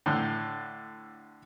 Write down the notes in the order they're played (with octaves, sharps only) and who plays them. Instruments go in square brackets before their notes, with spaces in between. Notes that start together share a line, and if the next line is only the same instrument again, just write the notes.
[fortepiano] A2 D3